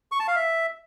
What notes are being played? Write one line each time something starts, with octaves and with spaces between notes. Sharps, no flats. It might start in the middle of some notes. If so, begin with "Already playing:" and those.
C#6
A5
F5
E5